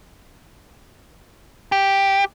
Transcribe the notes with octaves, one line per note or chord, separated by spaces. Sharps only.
G4